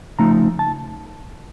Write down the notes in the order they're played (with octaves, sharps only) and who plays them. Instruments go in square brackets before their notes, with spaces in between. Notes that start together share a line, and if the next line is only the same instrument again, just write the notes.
[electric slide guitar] C#3 F3 A3 D#4 A#5
A5